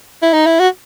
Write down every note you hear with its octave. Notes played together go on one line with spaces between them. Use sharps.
E4
D#4
E4
F#4